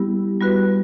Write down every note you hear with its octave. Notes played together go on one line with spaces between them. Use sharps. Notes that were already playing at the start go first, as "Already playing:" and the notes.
Already playing: G3 B3 E4 G4
G3 B3 F#4 B4